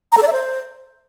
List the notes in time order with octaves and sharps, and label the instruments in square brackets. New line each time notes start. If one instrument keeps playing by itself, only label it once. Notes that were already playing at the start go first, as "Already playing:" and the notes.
[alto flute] A#5
A4
D5
E5
C5